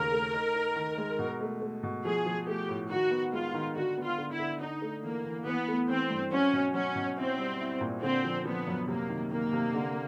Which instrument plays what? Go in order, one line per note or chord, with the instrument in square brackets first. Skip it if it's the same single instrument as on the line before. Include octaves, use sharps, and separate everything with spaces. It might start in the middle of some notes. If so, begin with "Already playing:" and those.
Already playing: [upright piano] D#2 C#3 A3 [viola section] A#4
[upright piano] A3
D#4
D#4
D#3
G#3
B2
A3
A3
B2
[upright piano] F3 [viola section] G#4
[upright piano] F3
[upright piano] A3 [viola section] G4
[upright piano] A2
[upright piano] D#3 [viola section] F#4
[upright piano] B3
[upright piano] G#3 [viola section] F4
[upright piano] D#3
[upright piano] D3 [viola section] F#4
[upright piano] B3
[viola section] F4
[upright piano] D3
[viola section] E4
[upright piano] D3
[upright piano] D4 [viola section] D#4
[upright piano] A3
[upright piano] E3 [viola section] A#3
[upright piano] E3
[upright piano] E3 [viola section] B3
[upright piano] A3
[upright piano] E3 [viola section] C4
[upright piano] G2
[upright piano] F#3 [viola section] C#4
[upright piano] B2
[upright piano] F#3 [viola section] C#4
[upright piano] B2
[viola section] C4 [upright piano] E4
[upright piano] G3
E4
A#2
[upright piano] D3 [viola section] C4
[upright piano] F3
[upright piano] F3 [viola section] B3
[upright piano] F#2
[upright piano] C3 [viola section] A#3
[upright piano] D#3
[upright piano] D#3 [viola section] A#3
[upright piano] C3
D3